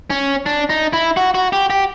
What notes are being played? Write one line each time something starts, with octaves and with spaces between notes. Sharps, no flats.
C#4
D4
D#4
E4
F#4
F#4
G4
G4